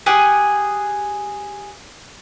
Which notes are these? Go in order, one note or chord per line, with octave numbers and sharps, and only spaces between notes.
G4 G#4 F#5